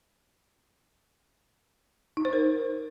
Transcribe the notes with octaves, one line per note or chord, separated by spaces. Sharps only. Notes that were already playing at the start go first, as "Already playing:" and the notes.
D#4
C5
A#4